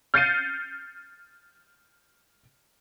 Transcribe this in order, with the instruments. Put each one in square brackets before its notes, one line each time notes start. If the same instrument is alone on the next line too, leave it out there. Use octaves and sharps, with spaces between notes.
[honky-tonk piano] F6 G6 A6 C7 C#7 D#7